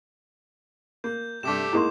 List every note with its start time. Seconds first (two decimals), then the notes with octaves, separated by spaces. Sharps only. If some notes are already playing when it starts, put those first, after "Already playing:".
1.04 A#3 G6
1.43 G2 C3 A3 G4 D6 E7
1.73 G#2 G#3 A#3 E4 G#4 C6